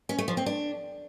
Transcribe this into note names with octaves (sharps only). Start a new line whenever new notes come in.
C#4
A3
F3
C4
D4